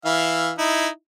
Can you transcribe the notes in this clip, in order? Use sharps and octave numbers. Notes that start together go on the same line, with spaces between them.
E3 E5 F5
D#4 E4